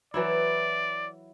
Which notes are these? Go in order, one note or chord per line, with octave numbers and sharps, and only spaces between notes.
E3 F#3 E4 D5